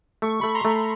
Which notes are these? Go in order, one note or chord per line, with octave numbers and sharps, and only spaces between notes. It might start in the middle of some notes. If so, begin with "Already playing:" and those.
A3 C#6
A3 B5 C#6
A#5 C6
A3